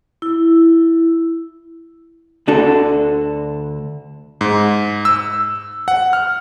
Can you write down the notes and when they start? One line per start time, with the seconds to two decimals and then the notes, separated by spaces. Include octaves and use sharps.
0.22 E4
2.48 D2 D3 D4 F#4 A4
4.41 G#2
5.05 E6
5.88 F#5
6.13 F6